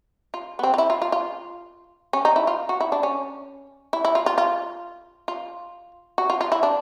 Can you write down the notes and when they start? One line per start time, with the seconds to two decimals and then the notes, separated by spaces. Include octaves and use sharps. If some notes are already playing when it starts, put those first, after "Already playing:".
0.34 F4
0.59 B3
0.63 C4
0.74 F4
0.78 E4
0.90 F4
1.02 F4
1.12 F4
2.13 C#4
2.25 D#4
2.36 E4
2.47 F4
2.69 F#4
2.81 E4
2.92 D4
3.03 C#4
3.93 E4
4.05 E4
4.15 F4
4.26 F4
4.38 F4
5.28 F4
6.18 F#4
6.30 F4
6.41 F4
6.52 E4
6.63 D4